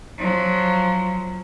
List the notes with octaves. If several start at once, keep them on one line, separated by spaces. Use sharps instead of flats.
F3 F#3